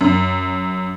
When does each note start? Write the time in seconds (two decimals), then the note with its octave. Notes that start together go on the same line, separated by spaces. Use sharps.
0.01 F#2